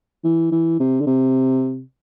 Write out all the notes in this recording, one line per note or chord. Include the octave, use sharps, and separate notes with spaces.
E3
E3
C3
D3
C3